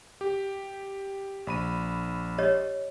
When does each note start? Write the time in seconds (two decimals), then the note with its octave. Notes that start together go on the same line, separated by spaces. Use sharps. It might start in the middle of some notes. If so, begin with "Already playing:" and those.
0.21 G4
1.47 A#1 B5 D#7
2.38 G4 C#5 D#5